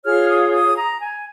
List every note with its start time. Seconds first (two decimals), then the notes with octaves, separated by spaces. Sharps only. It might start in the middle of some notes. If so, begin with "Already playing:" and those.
0.04 F4 G#4 C#5 F6
0.28 D#6
0.52 D#6
0.76 A#5
1.00 G#5